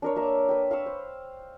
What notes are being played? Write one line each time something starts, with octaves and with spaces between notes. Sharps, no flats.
D4 A#4 C#5
A#3 E5 A#5
B4 G5
F5 B5 C#6 E6
C5